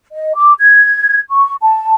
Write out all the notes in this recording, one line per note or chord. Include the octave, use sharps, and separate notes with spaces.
D#5
D6
G#6
C#6
A5